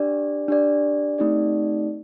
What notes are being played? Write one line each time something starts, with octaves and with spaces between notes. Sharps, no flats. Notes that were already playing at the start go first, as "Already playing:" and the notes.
Already playing: D4 G4 D5
D4 G4 D5
A3 C4 D#4 G4 D5